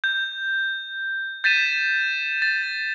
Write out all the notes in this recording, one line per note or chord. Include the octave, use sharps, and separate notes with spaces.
G6
G6 A6 B6 D#7 E7
A6